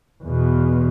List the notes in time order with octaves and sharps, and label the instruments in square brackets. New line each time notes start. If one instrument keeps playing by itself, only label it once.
[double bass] E2 B2